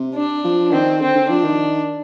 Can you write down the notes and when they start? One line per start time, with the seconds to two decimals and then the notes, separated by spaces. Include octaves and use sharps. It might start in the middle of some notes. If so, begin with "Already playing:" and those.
Already playing: C3
0.15 D4
0.44 F3
0.72 D#3 C4
1.01 D3 C4
1.15 D3
1.29 F3 D4
1.43 D#3